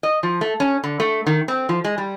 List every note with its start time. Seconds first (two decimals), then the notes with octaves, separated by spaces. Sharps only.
0.03 D#5
0.23 F3
0.41 A3
0.60 C#4
0.84 D3
1.00 A3
1.27 D#3
1.48 C4
1.69 F3
1.85 G#3
1.98 G3